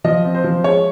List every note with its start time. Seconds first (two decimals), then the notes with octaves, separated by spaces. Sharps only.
0.04 F3 D#5
0.25 C4
0.35 C5
0.44 F3
0.64 G#3 C#5